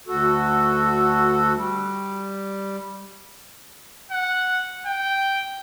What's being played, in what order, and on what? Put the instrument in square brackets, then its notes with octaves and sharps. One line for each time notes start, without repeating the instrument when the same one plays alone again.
[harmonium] D2 F#4 A4
G3
[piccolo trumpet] F#5
G5